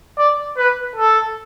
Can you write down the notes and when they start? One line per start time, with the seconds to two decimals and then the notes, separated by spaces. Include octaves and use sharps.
0.18 D5
0.58 B4
0.96 A4